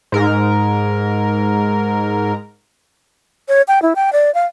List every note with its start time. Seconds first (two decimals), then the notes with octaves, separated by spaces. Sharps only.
0.12 G#2 A#4
3.48 C#5
3.68 G5
3.82 E4
3.96 G5
4.13 D5
4.34 F5